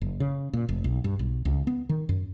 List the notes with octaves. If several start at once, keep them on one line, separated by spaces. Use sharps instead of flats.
F#1
C#3
A#2
F1
B1
G2
B1
C#2
B3
D#3
F#2